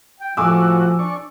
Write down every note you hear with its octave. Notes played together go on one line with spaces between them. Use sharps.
G5
A2 F3 F#4 G#5 D6 E6
D4 C#6